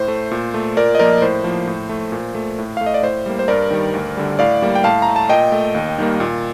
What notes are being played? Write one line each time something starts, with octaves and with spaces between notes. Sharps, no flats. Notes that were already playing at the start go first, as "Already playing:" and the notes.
Already playing: A2 C5
A3
A#2
A3
A#2 A#4 D5
D#5
F3 A#3 A#4 D5
A2 C5
F3 A#3
A2
A3
A#2
A3
A2
F5
A3
D#5
D5
A2 C5
G3 A#3
C5
G2 A#4 D5
D#3 G3
D2
D3 G3
A2 D5 F5
G3 A#3
G5
A2 F5 A5
A#5
A3
A5
A#2 D#5 G5
A3
D#2
D#3 G3 A#3
A#2